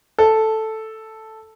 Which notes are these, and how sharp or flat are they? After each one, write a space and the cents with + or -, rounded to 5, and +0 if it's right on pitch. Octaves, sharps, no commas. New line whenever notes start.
A4 +0